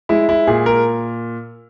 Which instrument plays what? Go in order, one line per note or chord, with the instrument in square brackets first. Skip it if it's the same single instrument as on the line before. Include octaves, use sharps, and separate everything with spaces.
[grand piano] G#3 E4
E4
A#2 G#4
A#4